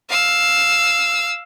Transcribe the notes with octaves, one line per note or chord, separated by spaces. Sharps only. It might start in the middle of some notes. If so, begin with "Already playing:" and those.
F5 E6